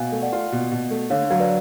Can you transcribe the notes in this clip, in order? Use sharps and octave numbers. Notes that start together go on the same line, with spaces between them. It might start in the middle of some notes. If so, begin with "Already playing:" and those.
Already playing: B2 F5 G#5
A3
D5 F#5
F4
B2
B2
A3
D3 C#5 F5
F#3 F5
B4 D5